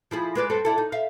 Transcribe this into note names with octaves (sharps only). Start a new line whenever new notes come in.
F3 E4 G#4
G#3 B4 D5
G2 C4 A4
D4 E4 A4
D#4
E5 F5